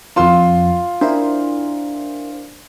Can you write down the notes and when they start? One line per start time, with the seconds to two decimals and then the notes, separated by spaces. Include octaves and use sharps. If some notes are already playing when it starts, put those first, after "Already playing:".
0.16 F2 F3 F4 C6
1.01 D4 E4 A#4 C5